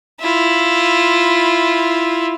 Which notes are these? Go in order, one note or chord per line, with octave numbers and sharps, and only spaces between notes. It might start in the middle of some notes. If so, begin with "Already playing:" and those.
E4 F4